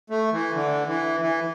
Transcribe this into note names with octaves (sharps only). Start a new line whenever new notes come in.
A3
E3
D3
E3
E3